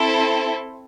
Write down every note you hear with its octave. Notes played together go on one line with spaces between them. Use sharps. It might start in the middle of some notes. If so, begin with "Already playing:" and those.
Already playing: C4 E4 A4